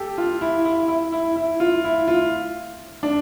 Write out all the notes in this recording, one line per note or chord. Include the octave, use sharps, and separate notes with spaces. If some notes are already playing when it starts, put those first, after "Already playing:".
Already playing: G4 A4
F4
E4
E4
E4
E4
E4
F4
E4
F4
D4